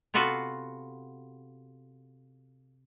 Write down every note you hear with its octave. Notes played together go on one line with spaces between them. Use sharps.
C3 B3 F4 F#4 A4 B4